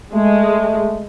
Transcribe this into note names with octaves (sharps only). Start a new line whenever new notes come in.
G#3 A3